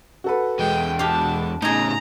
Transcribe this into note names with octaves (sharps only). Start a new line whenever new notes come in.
F#4 A4 B4
E2 G#3 G5
D4 G4 F5 A5
A2 C#3 D#4 G#4 A#5